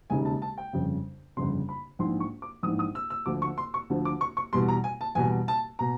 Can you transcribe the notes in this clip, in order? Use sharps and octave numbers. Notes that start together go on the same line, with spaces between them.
E1 D#2 C#3 G#5
A5
A5
G5
G1 F2 C#3
G1 F2 C#3 C6
B5
A#1 G#2 E3 C6
C#6
D6
A#1 G#2 E3 D#6
D#6
E6
E6
D2 D3 F3 D6
C#6
C6
C#6
D2 D3 F3
D6
C#6
C#6
E2 B2 G3 C6
A#5
G#5
A5
E2 B2 G3 G#5
A5
B2 A#5